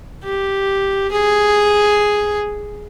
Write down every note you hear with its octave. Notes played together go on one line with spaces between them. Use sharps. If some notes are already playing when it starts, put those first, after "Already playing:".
G4
G#4